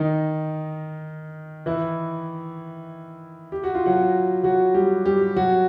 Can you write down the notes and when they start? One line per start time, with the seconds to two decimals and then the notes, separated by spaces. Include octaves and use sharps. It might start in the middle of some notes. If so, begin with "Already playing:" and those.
Already playing: D#3 D#4
1.66 E3 E4
3.52 G4
3.64 F#4
3.75 F4
3.86 F#3 F#4
4.44 F#3 F#4
4.74 G3 G4
5.05 G3 G4
5.36 F#3 F#4